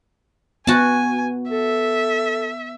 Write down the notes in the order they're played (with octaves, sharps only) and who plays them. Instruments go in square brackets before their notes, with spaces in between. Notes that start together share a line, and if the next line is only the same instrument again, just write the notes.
[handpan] B3 [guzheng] F#4 A5 [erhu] G#5
[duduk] A4 [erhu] E5